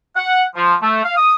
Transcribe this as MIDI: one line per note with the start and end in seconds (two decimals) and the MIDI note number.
0.16 0.44 78
0.56 0.74 53
0.82 1.00 57
1.04 1.14 77
1.17 1.36 87